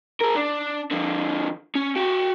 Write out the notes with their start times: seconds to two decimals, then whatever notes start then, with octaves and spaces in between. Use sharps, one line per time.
0.21 G#4 A#4
0.35 D4
0.91 D3 F3
1.75 C#4
1.96 F#4 G5